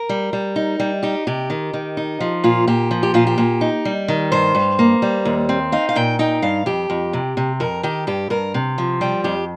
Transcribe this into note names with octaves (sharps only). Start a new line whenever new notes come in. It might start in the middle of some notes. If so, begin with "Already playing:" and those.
Already playing: A#4
G3
G3
D#4
G3
D#4 G4
C3 G4
D#3
D#3
D#4
F3
A#2 F4
A#2 G4
F3
G4
A#2 F4
G4
A#2
D#4
G3
D#3
G2 C5
G2
A#3
G3
D#2
C4
D#4 F5
F5
A#2 G5
D#4 G5
G2 F5
F2 G4
F2
C3
C3
F2 A#4
D#3 G4
G2 G4
G2 A#4
C3
F3
G3 G5
F2 G4